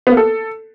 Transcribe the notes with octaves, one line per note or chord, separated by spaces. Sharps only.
B3
A#3
A4